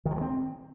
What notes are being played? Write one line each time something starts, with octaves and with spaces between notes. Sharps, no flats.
D#3
F3
G#3
C4